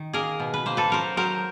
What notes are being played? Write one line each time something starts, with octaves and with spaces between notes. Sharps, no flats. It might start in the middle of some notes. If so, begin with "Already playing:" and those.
Already playing: D#3
A#3 G#4 A#4
B2
B4
A#3 C5
A4 B4
F#3 A#4 C5
F#3 A#4 C5